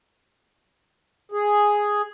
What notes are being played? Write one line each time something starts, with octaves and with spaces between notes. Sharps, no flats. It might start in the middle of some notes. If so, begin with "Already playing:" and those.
G#4